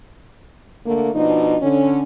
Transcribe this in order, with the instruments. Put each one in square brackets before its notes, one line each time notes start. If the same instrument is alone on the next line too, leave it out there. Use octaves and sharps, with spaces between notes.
[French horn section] D3 A3 A#3
B2 F3 D4 D#4
D3 C#4